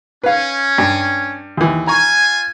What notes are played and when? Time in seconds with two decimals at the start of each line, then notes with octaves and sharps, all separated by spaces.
0.24 C#4 B4 F5
0.78 G2
1.57 D#2 E3
1.87 F4 G#5 A#5 C#6